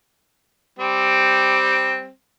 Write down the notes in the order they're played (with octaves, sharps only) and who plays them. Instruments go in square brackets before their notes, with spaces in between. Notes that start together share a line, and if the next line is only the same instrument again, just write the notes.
[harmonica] G3 C4